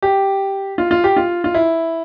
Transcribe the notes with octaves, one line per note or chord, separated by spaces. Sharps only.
G4
F4
F4
G4
F4
F4
E4